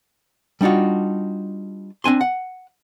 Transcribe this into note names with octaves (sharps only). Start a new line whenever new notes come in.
G3 D4 D#4 F4 F#4
C4 D4 G#5 C6
F#5